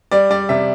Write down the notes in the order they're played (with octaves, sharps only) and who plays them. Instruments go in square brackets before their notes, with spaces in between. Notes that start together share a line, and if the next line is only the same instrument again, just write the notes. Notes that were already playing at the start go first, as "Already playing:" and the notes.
[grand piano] G3 D5
G3 D5
C3 E5